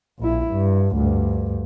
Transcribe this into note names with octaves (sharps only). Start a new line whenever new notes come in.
A#1 E4
G2
D2 G2